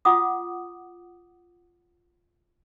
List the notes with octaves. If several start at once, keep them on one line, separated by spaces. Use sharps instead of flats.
F4 F#5 D6 D#6